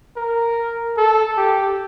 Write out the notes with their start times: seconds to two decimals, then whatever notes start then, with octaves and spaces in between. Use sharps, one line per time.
0.17 A#4
0.97 A4
1.38 G4